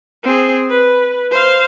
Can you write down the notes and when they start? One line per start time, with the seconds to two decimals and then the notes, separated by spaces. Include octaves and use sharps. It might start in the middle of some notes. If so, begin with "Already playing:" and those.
0.24 C4 G#4
0.70 B4
1.31 C5 F5